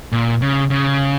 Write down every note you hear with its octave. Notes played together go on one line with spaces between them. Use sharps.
A#2
C#3
C#3